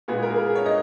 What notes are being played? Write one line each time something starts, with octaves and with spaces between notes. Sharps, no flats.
A#2 G#3 B3 G#4
A#4
G#4
A#4
G#4
C#5
D#5